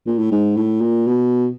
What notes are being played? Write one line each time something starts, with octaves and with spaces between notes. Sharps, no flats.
A#2
A2
G#2
A2
A#2
B2